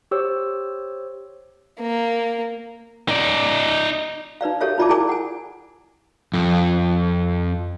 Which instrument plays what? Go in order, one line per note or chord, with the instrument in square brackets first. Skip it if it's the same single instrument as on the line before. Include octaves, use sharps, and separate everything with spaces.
[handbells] G4 C5 C#5 E6
[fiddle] A#3
[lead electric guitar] D#4 D5
[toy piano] D#4 B4 D5 F5
G4 A4 A#4 C#5 E5 F5
D#4 F4 D5 E5 A5 D6
E4 G#4 A#4 D5 G#5 D6
F#5 G#5
[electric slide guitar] F2